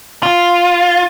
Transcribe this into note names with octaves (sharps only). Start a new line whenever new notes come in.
F4